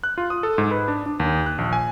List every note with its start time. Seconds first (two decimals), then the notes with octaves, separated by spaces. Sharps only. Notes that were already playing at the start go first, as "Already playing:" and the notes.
0.04 F#6
0.18 F4
0.30 D#6
0.43 A4
0.58 G#2
0.71 B4
0.88 D4
1.06 D4
1.20 D#2
1.46 F#6
1.58 A#1
1.73 G#5